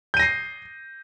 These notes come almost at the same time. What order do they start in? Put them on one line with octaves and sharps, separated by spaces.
G6 D#7 A#6 C7